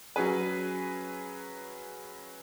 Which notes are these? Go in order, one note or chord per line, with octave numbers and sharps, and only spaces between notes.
F#3 C#4 G#4 B4